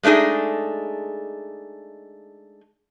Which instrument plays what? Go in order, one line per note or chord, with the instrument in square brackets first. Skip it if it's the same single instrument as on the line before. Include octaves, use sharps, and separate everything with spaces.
[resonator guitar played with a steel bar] G#3 A3 D4 D#4 G#4